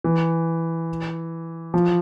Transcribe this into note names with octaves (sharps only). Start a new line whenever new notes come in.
E3
F3